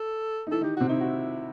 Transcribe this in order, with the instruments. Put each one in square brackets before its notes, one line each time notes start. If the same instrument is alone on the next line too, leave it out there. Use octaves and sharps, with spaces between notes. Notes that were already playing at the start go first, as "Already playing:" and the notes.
Already playing: [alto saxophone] A4
[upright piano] D#4
[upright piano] E3 E4 [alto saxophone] A4
[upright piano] D#3 D#4 [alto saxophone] G4
[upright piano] C3 C4 [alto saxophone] F#4
[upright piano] D#3 D#4 [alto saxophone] E4
[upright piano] F#4